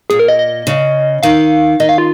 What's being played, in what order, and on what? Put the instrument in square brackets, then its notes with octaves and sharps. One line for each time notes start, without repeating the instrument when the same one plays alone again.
[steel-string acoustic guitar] A#2 [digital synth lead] G#4
[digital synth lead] A#4
D#5
D#5
[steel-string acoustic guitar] C#3
[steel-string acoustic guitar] D#3 [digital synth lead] F5
[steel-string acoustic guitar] D#3 [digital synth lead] D#5
[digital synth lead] F5
F4